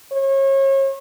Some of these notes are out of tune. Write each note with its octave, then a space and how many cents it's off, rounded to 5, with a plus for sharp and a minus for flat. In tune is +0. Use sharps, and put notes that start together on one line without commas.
C#5 -35